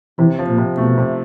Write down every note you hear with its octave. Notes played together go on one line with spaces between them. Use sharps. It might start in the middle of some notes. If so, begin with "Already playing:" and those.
C3 E3
F3
A#2
C3
B2 A3
C3